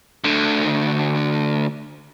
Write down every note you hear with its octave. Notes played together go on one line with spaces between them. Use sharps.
D2 D3